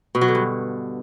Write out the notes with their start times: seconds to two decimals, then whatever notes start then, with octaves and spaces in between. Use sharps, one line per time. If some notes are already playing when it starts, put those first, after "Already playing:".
0.15 B2
0.21 F#3
0.28 D3
0.35 G2